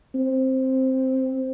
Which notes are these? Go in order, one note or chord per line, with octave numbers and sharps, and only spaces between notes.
C4